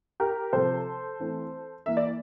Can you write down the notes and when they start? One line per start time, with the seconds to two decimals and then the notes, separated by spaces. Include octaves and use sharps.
0.20 G4 A#4
0.53 C3 F3 C4 A4 C5
1.20 E3 A3 C4
1.86 E3 A#3 E5
1.97 D5